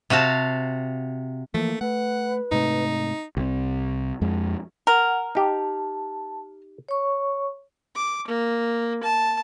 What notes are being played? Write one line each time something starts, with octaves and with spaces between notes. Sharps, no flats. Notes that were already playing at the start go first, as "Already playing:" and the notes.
C3 F#4 F5 A5
E3 F3 A3 A#3
A3 B4 F#5
G#2 C3 A3 D#4
C2 C3
F2 G#3
A#4 F#5
D#4 G4 A5
C#5 C#6
D6
A#3
A5